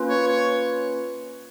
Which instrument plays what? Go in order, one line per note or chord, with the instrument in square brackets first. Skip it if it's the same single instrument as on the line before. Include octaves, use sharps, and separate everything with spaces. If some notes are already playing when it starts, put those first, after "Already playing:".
Already playing: [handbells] A#3 C#4 F4 B4
[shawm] C#5
C#5